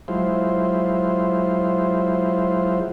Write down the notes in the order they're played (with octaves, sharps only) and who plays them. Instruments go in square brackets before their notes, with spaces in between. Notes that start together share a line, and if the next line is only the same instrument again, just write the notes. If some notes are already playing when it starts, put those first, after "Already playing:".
[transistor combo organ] F#3 G#3 E4 F4 C5